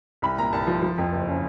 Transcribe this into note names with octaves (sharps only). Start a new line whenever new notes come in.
C2 B5
A#2 A#5
C2 A5
F3
F3
F2
F#1
C#3